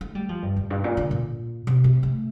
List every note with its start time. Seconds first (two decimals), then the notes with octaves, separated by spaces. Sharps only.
0.01 A3
0.15 G3
0.29 F3
0.42 G2
0.56 F2
0.70 G2
0.84 A#2
0.97 D3
1.11 A#2
1.67 C3
1.84 C3
2.03 A3